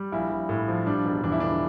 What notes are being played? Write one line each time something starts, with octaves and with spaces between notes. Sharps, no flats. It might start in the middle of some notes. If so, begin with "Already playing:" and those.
Already playing: G3
A#1 E4
A#1
A2
F3
G3 D4
E1
E2 D4
E4
D3 D4